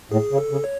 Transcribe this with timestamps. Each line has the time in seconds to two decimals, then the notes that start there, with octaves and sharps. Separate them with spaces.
0.11 A2 G#4
0.31 C#3
0.38 A4
0.51 C#3
0.64 C#5